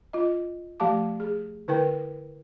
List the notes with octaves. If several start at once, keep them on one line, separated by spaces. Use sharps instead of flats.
F4 D#5
F3 A3 G4 F5 A5 D6
G#4
D3 E4 A#4 B4 G5